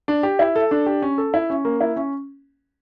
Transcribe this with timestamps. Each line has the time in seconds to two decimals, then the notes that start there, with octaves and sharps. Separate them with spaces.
0.08 D4
0.23 G4
0.39 E4
0.56 A4
0.71 D4
0.86 G4
1.02 C#4
1.18 A4
1.34 E4
1.50 C#4
1.65 A#3
1.81 E4
1.96 C#4